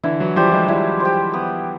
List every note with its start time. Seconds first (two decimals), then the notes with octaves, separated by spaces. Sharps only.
0.04 D3 E3 E4
0.20 E3 F#3
0.36 F3 G3 G4 C5
0.52 F#3 G#3
0.68 F3 G3 E4
1.00 G4 C5
1.33 B3